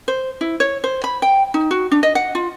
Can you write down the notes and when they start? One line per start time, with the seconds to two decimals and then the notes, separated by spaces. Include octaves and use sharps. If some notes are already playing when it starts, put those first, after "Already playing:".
0.08 C5
0.41 E4
0.60 C#5
0.84 C5
1.04 B5
1.22 G5
1.54 D#4
1.71 F#4
1.92 D4
2.03 D#5
2.15 F#5
2.35 F4